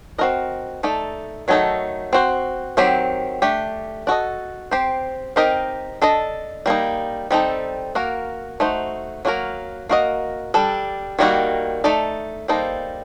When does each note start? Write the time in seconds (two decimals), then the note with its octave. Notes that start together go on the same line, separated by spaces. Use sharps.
0.18 C4 D#4 F#4 A#4 D#5
0.83 A3 D#4 A4 D5
1.48 D#3 F#3 A3 D#4 A4
2.13 C4 F#4 C5
2.77 D#3 F#3 C4 G4
3.42 A3 D4 G4
4.07 D4 F#4 A4 D#5
4.71 C4 G4 C5
5.36 C4 D#4 G4 A#4 D#5
6.02 D4 A4 D#5
6.66 G3 A#3 D#4
7.31 G3 C4 D#4 A4
7.95 A#3 F#4 A#4
8.60 A3 D#4 F#4 C5
9.25 F#3 A#3 D4 F#4 A#4
9.89 A#3 F#4 A#4 D#5
10.54 G3 D4 A4
11.19 D#3 G3 A#3 D#4 F#4
11.84 A3 D#4 A4 D5
12.48 G3 A#3 D#4 A4 C5